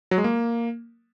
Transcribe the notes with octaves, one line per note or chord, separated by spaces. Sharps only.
F#3
G#3
A#3